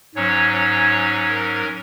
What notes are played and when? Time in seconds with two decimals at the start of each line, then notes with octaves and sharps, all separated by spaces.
0.15 G#2 F#3 C#4 C#5
0.53 C#5
1.29 A#4